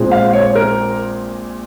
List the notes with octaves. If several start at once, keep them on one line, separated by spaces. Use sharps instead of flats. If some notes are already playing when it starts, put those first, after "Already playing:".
Already playing: A#1 A#2 G#3 C4
F5
C#5
A#4